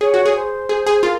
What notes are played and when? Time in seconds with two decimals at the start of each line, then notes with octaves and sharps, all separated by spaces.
0.01 G#4 C#5
0.14 F#4
0.26 G#4
0.36 C5
0.69 G#4
0.87 G#4
1.03 F4 A#4